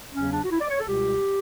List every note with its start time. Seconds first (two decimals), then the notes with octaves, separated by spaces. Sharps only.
0.13 E2 C#3 F#3 C#4
0.31 D4
0.44 F#4
0.50 E4
0.60 D5
0.70 C#5
0.79 A4
0.88 C#2 B2 G3 G4